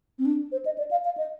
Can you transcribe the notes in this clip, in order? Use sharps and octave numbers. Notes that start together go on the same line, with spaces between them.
C4
D4
C5
D#5
D5
F5
F5
D#5